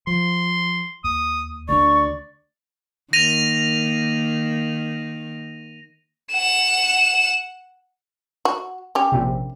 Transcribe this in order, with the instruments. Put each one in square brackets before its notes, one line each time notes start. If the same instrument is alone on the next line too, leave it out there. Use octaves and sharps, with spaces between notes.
[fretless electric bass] F3 [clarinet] C6
[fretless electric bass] D#2 [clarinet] D#6
[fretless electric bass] D2 A#3 D4 [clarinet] D5 [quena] C#6
[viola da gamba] D#3 A#3 [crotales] A#6 D#7 F7
[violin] F#5 E7
[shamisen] F#4
C#4 G4
[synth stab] A#1 C3